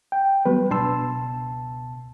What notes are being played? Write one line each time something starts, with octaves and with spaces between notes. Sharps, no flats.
G5
F#3 G3 B3 B4
C#2 B2 D4 A5 C6 E6